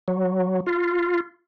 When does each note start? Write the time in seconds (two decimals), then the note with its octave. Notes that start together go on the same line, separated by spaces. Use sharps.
0.08 F#3
0.67 F4